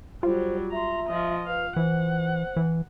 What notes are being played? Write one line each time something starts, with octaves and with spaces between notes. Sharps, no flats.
F#3 G3 F4 C5
E5 A#5 C6
F3 D#5
B4 F5
E3 C5 F#5
E3